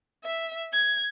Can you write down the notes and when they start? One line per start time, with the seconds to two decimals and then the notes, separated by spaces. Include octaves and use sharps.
0.24 E5
0.73 G#6